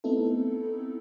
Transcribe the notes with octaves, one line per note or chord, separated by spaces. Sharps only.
A3 B3 C4 D#4 E4 A4